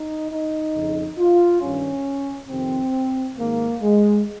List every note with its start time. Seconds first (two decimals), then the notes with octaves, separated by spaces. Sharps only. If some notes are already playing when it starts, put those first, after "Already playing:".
Already playing: D#4
0.31 D#4
0.74 F2 C#3
1.18 F4
1.61 G2 D#3 C#4
2.48 F2 C3 D#3 C4
3.36 G#2 D#3 A#3
3.81 G#3